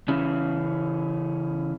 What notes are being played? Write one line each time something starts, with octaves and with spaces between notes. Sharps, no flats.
C#3 E3 C#4